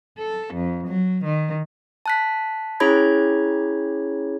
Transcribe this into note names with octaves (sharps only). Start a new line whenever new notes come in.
A4
F2
F#3
D#3
A5 F#6 B6
C#4 E4 G#4 C#5 B5 G#6